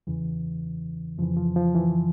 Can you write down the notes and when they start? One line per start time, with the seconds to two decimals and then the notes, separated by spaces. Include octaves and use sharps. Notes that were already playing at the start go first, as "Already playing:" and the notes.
0.07 E2 C#3 E3
1.18 F2 C#3 E3 F3
1.37 F3
1.56 F3
1.75 E3